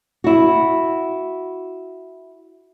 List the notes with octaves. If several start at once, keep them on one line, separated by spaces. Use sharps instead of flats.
E4 F#4